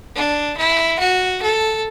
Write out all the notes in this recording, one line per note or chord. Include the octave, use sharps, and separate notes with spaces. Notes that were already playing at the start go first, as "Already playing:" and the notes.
D4
E4
F#4
A4